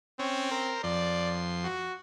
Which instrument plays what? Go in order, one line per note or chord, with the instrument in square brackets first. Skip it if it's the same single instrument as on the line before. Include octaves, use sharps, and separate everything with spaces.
[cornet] C4 [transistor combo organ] C#4
[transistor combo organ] A#4 C5
[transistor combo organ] F2 C6 [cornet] D5
[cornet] F#4